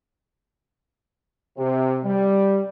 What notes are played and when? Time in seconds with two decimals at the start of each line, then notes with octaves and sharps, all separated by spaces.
1.58 C3
2.05 G3